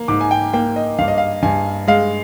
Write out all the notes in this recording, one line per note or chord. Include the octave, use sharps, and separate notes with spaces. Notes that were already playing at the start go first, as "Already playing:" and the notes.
Already playing: A#3
G#2 D6
G#5
G5
A#3 G5
D#5
G2 F5
D#5
F5
G2 G#5
G#3 F5